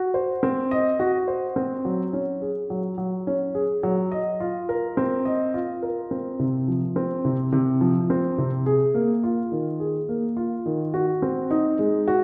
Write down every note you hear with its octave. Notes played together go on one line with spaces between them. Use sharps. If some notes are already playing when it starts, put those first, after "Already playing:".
Already playing: F#4
C5
C4
D#5
F#4
C5
C4
F#3
C#4
G#4
F#3
F#3
C#4
G#4
F#3
D#5
F4
A#4
C4
D#5
F4
A#4
C4
C3
F3
C4
C3
C3
F3
C4
C3
G#4
A#3
F4
D#3
G#4
A#3
F4
D#3
F#4
C4
D#4
G#3
F#4